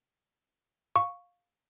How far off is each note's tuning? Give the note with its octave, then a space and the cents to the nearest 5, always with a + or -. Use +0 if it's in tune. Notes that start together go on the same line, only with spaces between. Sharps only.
F5 +15 C#6 +0